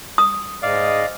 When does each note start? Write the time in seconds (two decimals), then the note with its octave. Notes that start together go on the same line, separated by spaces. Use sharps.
0.18 D#6
0.62 G#2 D5 D#5 F5